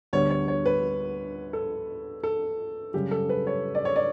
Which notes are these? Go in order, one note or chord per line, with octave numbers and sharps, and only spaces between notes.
D2 D3 G3 B3 C#5
C#5
C#5
B4
A4
A4
F#2 C#3 G3 G4
A4
B4
C#5
D5
C#5
D5